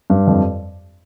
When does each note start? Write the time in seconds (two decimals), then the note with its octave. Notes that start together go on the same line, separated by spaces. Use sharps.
0.10 G2
0.27 F2